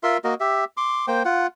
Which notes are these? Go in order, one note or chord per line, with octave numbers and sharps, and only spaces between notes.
F4 A#4 E5 C6
A#3 F#4 A#4 D#5
G4 E5
C6 D6
A#3 C5 G5
F4 F#5